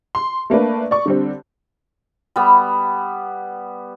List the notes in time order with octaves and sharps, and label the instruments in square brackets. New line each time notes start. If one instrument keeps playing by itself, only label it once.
[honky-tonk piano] C6
A3 A#3 D4 B4
D5 C#6
D3 G3 C4
[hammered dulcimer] G3 B3